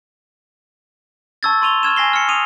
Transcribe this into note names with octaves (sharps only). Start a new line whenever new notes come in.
A5 C#6 E6 G#6 A6
C6 C#6 D#7 F7 G7
C#6 F6 G#6 E7
G#5 A#6 C7 G7
F6 C#7
D#6 D#7 F7